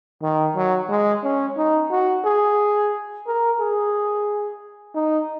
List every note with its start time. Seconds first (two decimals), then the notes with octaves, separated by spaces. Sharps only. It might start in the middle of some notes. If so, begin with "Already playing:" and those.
0.22 D#3
0.56 F#3
0.89 G#3
1.23 C#4
1.57 D#4
1.91 F#4
2.25 G#4
3.27 A#4
3.60 G#4
4.95 D#4